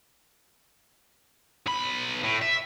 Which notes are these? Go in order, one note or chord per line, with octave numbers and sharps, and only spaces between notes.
B1 B5
A2
E5